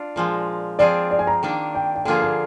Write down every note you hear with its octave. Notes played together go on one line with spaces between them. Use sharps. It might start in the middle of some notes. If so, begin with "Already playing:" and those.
Already playing: D4 F4
A#2 F3 G#3
F3 C4 F4 G#4 D5
D5
G#5
A#5
D#3 A#3 D4
G5
G5
D3 F3 A#3 F4 G#4 G#5
G#5